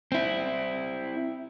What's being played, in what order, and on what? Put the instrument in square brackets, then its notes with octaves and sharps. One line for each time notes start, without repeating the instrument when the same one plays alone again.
[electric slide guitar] C4 E4